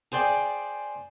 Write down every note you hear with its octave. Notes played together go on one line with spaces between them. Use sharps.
G#4 C5 D5 G5